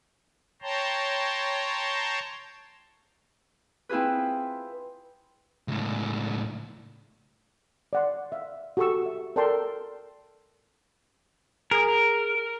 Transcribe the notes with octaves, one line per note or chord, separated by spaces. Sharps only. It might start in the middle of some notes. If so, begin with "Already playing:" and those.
C#5 G5 A5 A#5 C6
C4 E4 F4 G#4 B4
C#2 A2
D5 F#5 C6
E5 F5
F#4 G4 A4 A5 C#6 E6
E5
A4 A#4 D5 G5 A5 C6
G#4 A#4